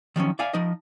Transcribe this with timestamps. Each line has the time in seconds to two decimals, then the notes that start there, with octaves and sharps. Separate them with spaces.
0.16 D#3 F3 F#3 C#4
0.39 D5 E5 F5 G#5
0.53 F3 D#4 D#5